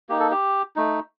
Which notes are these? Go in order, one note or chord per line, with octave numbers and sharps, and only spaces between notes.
A#3 D#4 G4
A4
G4
A3 D#4